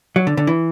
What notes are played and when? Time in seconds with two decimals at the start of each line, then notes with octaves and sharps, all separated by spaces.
0.16 F#3
0.27 D3
0.37 D3
0.47 E3